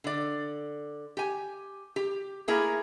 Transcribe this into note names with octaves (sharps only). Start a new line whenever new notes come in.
D3 D5
G4 G#5
G4
A3 A#3 E4 G#4 A#4